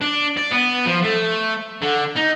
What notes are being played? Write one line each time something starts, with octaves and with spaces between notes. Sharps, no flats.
D4
D5
B3
F3
A3
D3
D#4